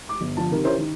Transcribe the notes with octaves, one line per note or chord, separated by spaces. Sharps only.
D6
G1
D3 F3 A5
C3 D#3 A#4
C#4 E4 G4 A#4 C5 C#5
D#3